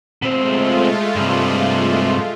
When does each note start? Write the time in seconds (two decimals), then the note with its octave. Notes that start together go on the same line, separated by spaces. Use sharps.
0.22 B2 G#3 A3 C4 F4
1.16 G2 C3